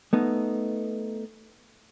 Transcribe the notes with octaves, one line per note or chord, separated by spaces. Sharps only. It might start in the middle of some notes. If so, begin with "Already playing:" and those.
A3 B3 D#4